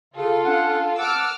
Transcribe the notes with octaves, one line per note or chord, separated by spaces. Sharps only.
C#3 F4 A4
C#4 D4 F#5
F#5 A5 D6 E6 F6